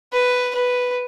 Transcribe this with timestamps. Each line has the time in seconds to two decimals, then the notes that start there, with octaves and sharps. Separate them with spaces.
0.13 B4
0.55 B4